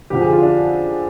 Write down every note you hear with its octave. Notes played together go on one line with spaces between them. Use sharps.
F2 D3 F3 G4
G#4
F4
D4